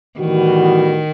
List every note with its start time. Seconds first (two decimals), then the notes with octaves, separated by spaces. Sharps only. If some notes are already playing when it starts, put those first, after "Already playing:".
0.19 A2 D#3 E3 G3 B3 F#4